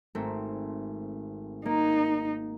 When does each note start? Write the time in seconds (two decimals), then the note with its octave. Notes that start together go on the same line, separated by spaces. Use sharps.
0.15 G#1 A3 C4
1.66 A#3 D#4